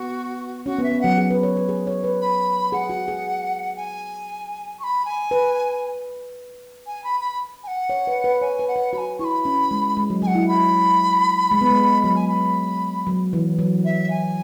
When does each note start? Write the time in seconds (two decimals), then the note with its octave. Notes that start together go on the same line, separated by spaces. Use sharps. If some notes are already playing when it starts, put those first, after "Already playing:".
Already playing: B3 F#4
0.66 C#4 F#4
0.79 B3
0.83 E5
0.92 B3
1.01 F#3 F#5
1.18 G#4
1.30 B4
1.43 C#5
1.57 B4
1.69 G#4
1.87 C#5
2.04 B4
2.21 B5
2.72 G#4 F#5
2.90 F#4
3.08 G#4
3.76 G#5
4.79 C#6
4.84 B5
5.05 G#5
5.31 B4
6.87 G#5
7.04 B5
7.20 B5
7.63 G#5
7.67 F#5
7.90 C#5
8.07 B4
8.24 B4
8.41 C#5 G#5
8.59 B4
8.68 F#5
8.76 B4
8.93 F#4 B5
8.98 G#5
9.19 E4 C#6
9.24 B5
9.45 C#4
9.71 G#3
9.97 G#3
10.10 F#3
10.22 F#3 G#5
10.27 F#5
10.35 E4
10.48 B5
11.51 G#3
11.61 B3
11.70 G#3
12.03 F#3 B5
12.15 G#5
12.28 B5
13.07 F#3
13.33 E3
13.59 F#3
13.85 E5
14.10 G#5